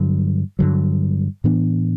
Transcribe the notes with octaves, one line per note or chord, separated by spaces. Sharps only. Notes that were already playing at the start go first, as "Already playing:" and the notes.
Already playing: G2 D3 F#3
G2 D3 F#3
A2 E3 B3 D4